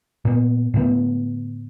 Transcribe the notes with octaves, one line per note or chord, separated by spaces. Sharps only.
A#2 B3
A2 D3 A3 B3